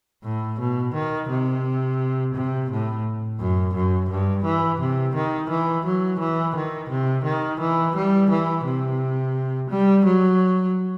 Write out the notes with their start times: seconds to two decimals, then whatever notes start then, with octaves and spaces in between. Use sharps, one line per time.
0.24 A2
0.60 B2
0.94 D#3
1.30 C3
2.35 C3
2.70 A2
3.40 F#2
3.74 F#2
4.10 G2
4.45 E3
4.80 C3
5.15 D#3
5.50 E3
5.85 F#3
6.20 E3
6.55 D#3
6.89 C3
7.24 D#3
7.60 E3
7.96 G3
8.30 E3
8.65 C3
9.70 G3
10.05 F#3